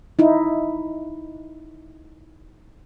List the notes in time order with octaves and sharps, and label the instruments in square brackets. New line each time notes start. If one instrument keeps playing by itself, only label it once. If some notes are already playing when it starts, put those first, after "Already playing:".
[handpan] D#4 E4